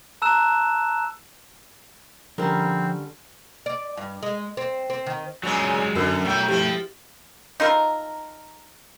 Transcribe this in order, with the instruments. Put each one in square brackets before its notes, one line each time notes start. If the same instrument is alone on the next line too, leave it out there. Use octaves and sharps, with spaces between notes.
[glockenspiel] A5 A#5 E6 F#6 E7
[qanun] D3 G3 C#4 [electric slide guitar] F3 A#5 [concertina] C4 [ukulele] A#4
[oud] D5
G2
G#3
C4
C4
D#3
[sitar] A#2 C#3 C#4 [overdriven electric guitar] F#3 G#3
[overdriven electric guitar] F#2 [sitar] D3 [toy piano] F#4 A#4 C5
[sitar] F#3 E4 [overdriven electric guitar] A3 G5
[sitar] F3 C4 [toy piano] E4 G4
[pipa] D#4 F4 A4 A#4